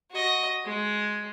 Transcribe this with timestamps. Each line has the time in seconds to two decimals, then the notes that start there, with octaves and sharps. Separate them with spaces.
0.11 F#4 D#5
0.65 G#3